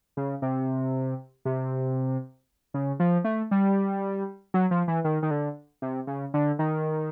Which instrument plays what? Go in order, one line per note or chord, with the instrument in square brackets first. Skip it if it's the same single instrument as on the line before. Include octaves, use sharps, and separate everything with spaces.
[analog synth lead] C#3
C3
C3
C#3
F3
A3
G3
F#3
F3
E3
D#3
D#3
D3
C3
C#3
D3
D#3